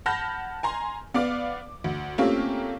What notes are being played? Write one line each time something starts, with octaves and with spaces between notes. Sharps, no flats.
F#5 A5 B5 F6 G6 A#6
G#5 A#5 C6
B3 D5 F5 D6
D2
A3 A#3 C4 C#4 F4 G4